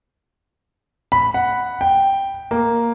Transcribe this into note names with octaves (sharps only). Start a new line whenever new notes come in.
B5
F#5
G5
A#3